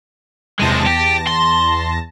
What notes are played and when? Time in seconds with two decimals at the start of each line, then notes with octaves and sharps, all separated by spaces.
0.59 E2 C3 G#3 A5 A#6
0.86 G4
1.27 C6